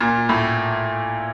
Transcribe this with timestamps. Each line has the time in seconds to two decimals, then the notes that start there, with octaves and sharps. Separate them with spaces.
0.01 A#2
0.29 A2